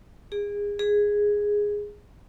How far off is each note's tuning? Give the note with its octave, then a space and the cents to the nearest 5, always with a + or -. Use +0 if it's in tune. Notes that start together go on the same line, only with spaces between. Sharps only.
G#4 -25
G#4 -5